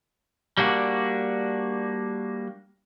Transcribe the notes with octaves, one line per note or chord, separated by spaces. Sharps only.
G3 A#3 D4 F#4